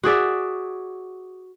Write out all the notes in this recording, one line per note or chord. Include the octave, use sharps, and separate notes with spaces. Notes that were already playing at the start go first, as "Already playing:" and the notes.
F#4 G#4 D5 E5